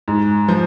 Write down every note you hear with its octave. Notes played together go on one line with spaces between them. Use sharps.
G#2
F3